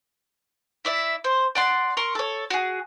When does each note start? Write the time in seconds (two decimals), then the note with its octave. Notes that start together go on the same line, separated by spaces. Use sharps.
0.85 E4 D5 E5
1.24 C5
1.55 D5 F#5 C6
1.97 A#4 C6 C#6
2.15 A4 C#5
2.50 F#4 G#4